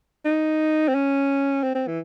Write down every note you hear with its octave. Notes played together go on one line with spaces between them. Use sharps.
D#4
C4
C#4
C4
C4
E3